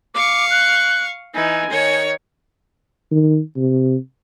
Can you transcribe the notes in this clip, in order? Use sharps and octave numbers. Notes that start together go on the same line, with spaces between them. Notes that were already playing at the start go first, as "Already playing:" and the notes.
F5 C#6 D6
F#6
E3 D#4 G#5
D#3 C#5
D#3
C3